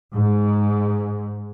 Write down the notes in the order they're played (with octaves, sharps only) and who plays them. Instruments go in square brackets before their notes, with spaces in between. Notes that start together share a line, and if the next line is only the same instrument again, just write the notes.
[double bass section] G#2